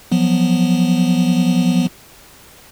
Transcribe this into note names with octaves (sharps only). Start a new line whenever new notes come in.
F3 F#3 B3